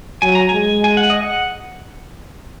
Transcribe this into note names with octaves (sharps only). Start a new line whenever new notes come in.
F#3 G#5
A#5
G#3 G#5
G#5
F#5
D#5
F#5